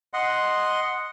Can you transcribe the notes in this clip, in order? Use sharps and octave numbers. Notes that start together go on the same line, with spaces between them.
D#5 F#5 C6